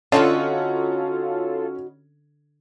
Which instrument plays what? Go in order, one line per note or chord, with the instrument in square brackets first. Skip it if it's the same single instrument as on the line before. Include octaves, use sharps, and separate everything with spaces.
[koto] D3 C4 [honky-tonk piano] C#4 [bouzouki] D#4 F#4 B4 [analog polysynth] F4 A4